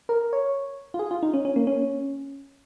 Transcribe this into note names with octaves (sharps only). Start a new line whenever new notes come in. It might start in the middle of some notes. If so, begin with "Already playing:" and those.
A#4
C#5
F4
G#4
F4
D#4
C#4
C#4
A#3
C#4